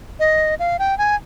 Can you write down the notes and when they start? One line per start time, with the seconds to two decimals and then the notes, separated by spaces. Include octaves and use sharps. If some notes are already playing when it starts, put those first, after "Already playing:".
0.20 D#5
0.59 F5
0.79 G5
0.98 G#5